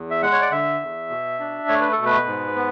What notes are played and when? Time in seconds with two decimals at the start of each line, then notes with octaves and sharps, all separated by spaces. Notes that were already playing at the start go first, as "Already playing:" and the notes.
Already playing: E2
0.11 E5
0.22 G#3 F#5
0.32 C#5
0.41 D5
0.51 D3 E5
0.81 E2
1.10 B2
1.40 D4
1.68 A3 C#5
1.80 B4
1.92 A4
1.98 B2
2.05 B4
2.27 G#2
2.56 B3